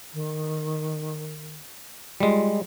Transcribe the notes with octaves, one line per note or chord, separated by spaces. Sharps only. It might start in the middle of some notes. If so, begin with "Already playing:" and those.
D#3
G3 G#3 F4